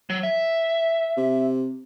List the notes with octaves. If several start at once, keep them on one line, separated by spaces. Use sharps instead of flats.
F#3
E5
C3